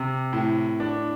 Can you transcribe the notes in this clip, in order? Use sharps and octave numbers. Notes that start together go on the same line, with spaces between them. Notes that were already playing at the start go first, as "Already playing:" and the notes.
Already playing: C3
A2
D4